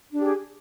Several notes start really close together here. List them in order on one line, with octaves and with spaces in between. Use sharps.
D4 G4 G#4